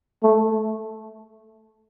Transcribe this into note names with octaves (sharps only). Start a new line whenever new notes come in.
A3